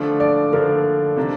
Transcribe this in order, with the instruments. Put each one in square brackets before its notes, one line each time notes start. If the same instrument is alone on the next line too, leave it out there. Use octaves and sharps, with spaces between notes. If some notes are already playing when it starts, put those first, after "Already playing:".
Already playing: [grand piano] D3 F3 A3 D4
[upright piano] D5
[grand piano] D3 F3 A3 D4 [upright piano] A#4
[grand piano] C3 D#3 A#3 D4